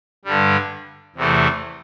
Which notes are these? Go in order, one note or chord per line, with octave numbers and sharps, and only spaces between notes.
G2 D3 G3
E2 C3 E3 A3